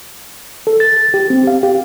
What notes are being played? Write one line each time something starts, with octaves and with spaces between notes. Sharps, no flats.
A4
A6
G4
C4
F5
G4